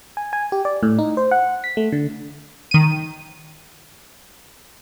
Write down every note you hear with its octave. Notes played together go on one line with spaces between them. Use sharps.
G#5
G#5
G4
D5
A2
D#4
C5
F#5
B6
A3
D3
D#3 D#7